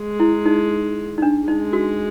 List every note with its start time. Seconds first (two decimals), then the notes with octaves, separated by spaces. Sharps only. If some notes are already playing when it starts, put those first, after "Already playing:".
Already playing: G#3
0.20 E4
0.46 D#4
1.18 D#4
1.22 D4
1.48 G#3 D#4
1.73 F#4